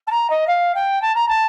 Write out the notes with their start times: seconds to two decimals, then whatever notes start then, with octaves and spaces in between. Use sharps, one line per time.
0.07 A5
0.11 A#5
0.30 D#5
0.47 F5
0.75 G5
1.02 A5
1.14 A#5
1.28 A5